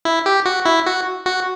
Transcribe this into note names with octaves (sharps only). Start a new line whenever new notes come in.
E4
G4
F#4
E4
F#4
F#4